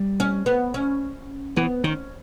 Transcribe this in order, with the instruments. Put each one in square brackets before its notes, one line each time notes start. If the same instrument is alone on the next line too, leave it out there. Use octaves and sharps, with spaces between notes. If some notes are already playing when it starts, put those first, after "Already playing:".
Already playing: [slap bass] G3
[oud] C#4
B3
C#4
[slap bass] E3 [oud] B3
[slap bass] D#3 [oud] C#4